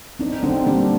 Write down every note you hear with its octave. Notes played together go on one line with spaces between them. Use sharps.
C4 D4 D#4
D3 C4 D#4
G3 A#3 D4